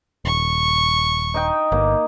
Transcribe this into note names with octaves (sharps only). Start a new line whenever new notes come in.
D#1 C#6
D#4 D#5 G5
G1 A#3